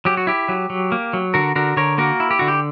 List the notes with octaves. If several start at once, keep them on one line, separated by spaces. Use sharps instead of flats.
F#3 G4
F#4
E4 G4
F#3
F#3
A#3
F#3
D3 F#4 A#4
D3 F#4 A#4
D3 A#4 C#5
A#3 F#4 A#4
E4
G4
D3 F#4
G4